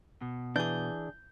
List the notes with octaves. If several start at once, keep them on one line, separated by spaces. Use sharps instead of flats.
B2
E3 D4 G#4 G6